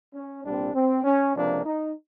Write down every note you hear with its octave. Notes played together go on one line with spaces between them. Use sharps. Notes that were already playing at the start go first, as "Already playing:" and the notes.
C#4
C2 A#2 G3 C4 D4
C4
C#4
C#2 C3 F3 A#3 D4
D#4